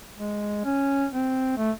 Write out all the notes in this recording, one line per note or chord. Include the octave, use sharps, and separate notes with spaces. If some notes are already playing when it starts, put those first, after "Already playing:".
G#3
C#4
C4
A3